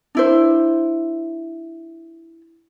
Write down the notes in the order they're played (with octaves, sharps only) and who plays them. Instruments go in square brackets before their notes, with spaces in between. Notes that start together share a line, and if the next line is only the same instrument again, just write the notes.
[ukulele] D4 E4 C5